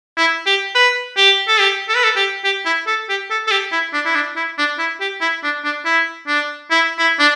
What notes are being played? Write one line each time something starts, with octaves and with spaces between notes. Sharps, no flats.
E4
G4
B4
G4
A4
G4
A4
B4
A4
G4
G4
E4
A4
G4
A4
A4
G4
E4
D4
E4
D4
E4
D4
E4
G4
E4
D4
D4
E4
D4
E4
E4
D4